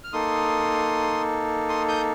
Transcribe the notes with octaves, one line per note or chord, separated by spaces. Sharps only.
F6
A#3 D#4 A4 C6 D#6
C6 D#6
D#6 G6